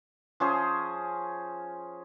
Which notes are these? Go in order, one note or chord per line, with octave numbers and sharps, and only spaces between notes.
F3 C#4 G#4 C5